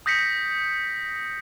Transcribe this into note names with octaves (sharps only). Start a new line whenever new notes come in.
D#6 G6 A#6 B6 C#7